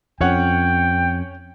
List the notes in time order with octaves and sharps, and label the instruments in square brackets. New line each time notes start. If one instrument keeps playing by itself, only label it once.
[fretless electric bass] F2 [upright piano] C#4 C#5 F#5 [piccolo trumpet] G5